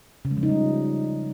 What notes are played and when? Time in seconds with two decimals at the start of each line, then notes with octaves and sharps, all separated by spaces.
0.25 C#3
0.31 G#3
0.37 F3
0.43 D#4
0.49 G3